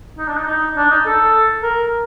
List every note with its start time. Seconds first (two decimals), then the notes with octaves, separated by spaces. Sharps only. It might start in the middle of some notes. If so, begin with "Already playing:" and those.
0.18 D#4
0.28 D4
0.37 D#4
0.47 D#4
0.76 D4
0.90 D#4
1.06 A4
1.63 A#4